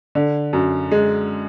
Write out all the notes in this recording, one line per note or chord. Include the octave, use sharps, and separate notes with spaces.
D3
F#2
G#3